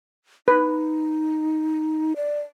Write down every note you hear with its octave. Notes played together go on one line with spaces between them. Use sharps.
D#4 B4
D5